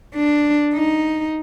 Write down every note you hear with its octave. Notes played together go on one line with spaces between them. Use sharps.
D4
D#4